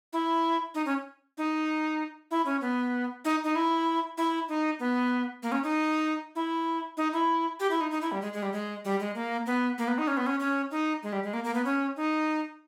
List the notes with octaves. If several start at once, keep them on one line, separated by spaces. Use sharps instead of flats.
E4
D#4
C#4
D#4
E4
C#4
B3
D#4
D#4
E4
E4
D#4
B3
A#3
C#4
D#4
E4
D#4
E4
G4
E4
D#4
D#4
E4
G3
G#3
G#3
G3
G#3
G3
G#3
A#3
B3
A#3
B3
D#4
C#4
B3
C#4
C#4
D#4
G#3
G3
G#3
A#3
A#3
B3
C#4
D#4